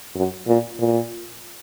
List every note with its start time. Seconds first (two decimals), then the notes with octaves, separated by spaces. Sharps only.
0.15 F#2
0.47 A#2
0.79 A#2